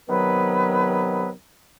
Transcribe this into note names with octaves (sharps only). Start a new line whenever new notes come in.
C3 D#3 F#3 B3 B4